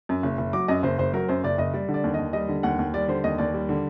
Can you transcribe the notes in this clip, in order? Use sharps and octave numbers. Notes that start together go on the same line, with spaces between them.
F#2
F#1
F#1
F#3 D6
F#2 D#5
F#1 C5
F#1 C5
F#3 A#4
F#2 C5
F#1 D5
F#1 D#5
G3 D5
D3
D5
D#2
D#2 D#5
G3 D#5
D3
D#2 F#5
D#2
G3 D5
D3 C5
D#2 D#5
D#2 D5
G3
D3